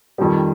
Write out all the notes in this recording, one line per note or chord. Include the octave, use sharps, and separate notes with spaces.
F2 D#3 G3